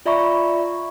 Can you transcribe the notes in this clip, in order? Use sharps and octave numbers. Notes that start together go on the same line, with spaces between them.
F4 D5 E5 A#5 B5 C#6